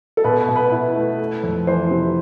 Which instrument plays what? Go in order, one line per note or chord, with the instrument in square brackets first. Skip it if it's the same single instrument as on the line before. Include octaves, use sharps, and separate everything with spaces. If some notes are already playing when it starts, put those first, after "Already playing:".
[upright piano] A4
[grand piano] B2 [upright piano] B4
[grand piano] B2
[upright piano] B4
[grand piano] E4
A3
A3
F2
[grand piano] E3 [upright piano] C5
[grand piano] C3